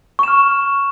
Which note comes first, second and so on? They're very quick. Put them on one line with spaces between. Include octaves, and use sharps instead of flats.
C#6 E7 F6